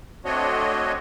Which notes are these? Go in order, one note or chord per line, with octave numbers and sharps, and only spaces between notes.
A3 C4 D4 F#4 C#5 D#5